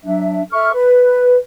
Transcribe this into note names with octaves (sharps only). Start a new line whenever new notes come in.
F#3 D4 E5
A4 E5 C#6 F6
B4